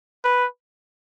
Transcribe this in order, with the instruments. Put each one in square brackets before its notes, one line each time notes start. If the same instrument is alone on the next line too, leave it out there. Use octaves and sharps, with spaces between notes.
[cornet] B4